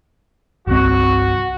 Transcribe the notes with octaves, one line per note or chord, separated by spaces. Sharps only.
G1 C2 C4 F#4